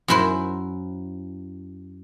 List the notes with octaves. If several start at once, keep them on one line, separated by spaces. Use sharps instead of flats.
F#2 F#3 E4 C5